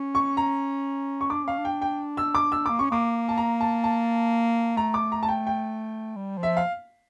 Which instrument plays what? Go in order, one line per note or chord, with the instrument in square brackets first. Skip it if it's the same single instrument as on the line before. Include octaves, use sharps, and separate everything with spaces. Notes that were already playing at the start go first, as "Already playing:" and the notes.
Already playing: [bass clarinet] C#4
[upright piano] C#6
A#5
C#6
[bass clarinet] D4 [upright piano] D6
[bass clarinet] C#4 [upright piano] F5
[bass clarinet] D4
[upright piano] G5
G5
E6
D6
E6
[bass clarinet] A#3 [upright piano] D6
[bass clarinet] C#4 [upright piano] C#6
[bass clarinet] A#3 [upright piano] D6
[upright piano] A5
A#5
A5
A5
[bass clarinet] A3 [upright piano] A#5
[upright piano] D6
A#5
A5
G5
G5
[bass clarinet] G3
F3
[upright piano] E5
F5